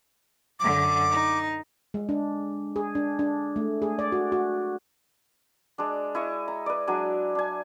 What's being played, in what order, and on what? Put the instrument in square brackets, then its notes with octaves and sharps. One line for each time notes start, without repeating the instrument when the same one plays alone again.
[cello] F#2 D3 [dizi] D6
[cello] D#4
[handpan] G#3
D4
G#4
D4
D4
A3
G#4
D5
F#4
F#4
[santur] G#3 D4
E4 D#5 C#6
A#5
B4 D5
F#3 G#3 D4 G#5
D4 G#5